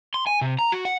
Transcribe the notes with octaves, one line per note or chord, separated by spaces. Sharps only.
C6
G#5
C3
A#5
F#4
F#5